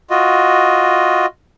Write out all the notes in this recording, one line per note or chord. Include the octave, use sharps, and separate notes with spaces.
F4 F#4 D#5